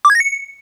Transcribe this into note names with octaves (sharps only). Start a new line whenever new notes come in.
D6
G#6
A#6
C#7